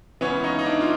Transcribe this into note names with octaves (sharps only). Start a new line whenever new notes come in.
C#2 C#3 E3 B3 C#4
C#4 D#4
D#4
D4 E4
F4